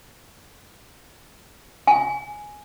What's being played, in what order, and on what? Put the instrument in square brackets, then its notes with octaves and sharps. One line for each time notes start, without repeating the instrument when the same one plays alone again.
[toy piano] G#5